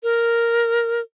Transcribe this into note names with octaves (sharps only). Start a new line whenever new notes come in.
A#4